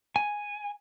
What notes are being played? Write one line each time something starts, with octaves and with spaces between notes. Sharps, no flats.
G#5